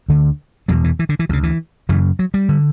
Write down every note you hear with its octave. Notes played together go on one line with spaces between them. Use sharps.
D2 D3
E2 B2 F#3
E3
E3
D3
E3
D2 C#3 F#3
E3
F#2 C#3 E3
F#3
G3
D3